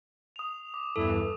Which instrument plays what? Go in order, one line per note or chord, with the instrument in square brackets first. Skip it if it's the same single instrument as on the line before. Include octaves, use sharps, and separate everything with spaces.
[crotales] D#6 F7
D6
[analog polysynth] E2 G2 E3 [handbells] A4